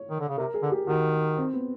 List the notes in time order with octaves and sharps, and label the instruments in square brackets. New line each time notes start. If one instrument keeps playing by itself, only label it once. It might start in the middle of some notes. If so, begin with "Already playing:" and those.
Already playing: [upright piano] C#5
[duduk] D#3
D3
C#3
[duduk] C3 [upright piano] A#4
[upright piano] G#4
[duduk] D3
[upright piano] G4
[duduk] D#3 [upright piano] F#4
[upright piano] C4
B3